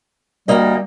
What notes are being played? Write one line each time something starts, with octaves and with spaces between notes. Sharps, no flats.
D2 G3 A#3 D#5